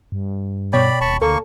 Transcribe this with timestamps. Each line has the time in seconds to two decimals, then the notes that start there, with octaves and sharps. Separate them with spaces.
0.12 G2
0.73 B2 C#5 D5 G5 B5
1.01 D#1 A5 B5 C#6
1.22 D2 A#3 A4 C#6